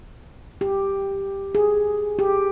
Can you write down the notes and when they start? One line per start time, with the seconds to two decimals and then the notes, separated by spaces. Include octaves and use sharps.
0.61 G4
1.55 G#4
2.19 G4